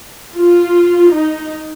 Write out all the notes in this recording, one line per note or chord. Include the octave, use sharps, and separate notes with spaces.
F4
D#4